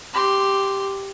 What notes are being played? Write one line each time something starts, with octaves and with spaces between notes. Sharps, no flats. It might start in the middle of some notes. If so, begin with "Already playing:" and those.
G4 C6